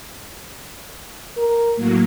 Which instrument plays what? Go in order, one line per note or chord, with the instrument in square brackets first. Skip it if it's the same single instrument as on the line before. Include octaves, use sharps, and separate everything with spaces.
[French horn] A#4
[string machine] A2 F#3 A#3